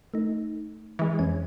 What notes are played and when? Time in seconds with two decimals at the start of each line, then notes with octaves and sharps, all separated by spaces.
0.14 A3 D#4
0.99 E3 G#3
1.19 F2 C#4 G#5